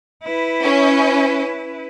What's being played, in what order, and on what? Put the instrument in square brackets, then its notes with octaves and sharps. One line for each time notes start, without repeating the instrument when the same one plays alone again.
[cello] E4 B4
[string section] C#4